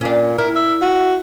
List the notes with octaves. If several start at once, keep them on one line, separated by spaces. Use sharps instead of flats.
A#2 C#4 D4
E4 A#4
E5
F#4